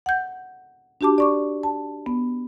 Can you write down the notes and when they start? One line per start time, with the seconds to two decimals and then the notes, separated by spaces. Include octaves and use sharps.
0.06 F#5 G6
1.01 D4 F#4 G4 A5 D6
1.18 D5 C#6 D6
1.63 A5
2.06 B3